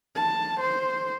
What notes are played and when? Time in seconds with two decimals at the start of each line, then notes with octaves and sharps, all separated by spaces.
0.15 A5
0.60 C5